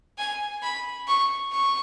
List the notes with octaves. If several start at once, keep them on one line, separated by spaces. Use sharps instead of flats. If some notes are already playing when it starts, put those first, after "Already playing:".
G#5
B5
C#6
C#6